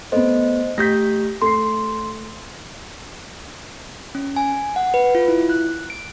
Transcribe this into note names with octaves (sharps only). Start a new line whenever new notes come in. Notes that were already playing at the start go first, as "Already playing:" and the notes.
A3 B3 C5 D#5
A3 G4 G6 A#6 B6
A3 C6 C7
C#4
G#5
F#5
B4
F4
E4
F#6
D7